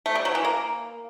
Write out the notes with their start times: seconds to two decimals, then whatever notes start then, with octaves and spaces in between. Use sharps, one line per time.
0.06 A3
0.15 G3
0.25 F#3
0.35 E3
0.45 A#3